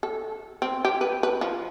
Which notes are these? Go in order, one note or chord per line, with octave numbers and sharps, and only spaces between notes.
A4
C4
G4
B4
B4
F3